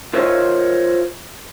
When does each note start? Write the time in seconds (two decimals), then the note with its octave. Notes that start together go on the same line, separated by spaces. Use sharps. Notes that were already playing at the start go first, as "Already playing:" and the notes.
0.13 F4 A#4 C5 C#5 D#5 E5